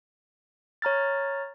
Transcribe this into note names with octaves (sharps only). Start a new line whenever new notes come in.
C#5 A#5 F6 A6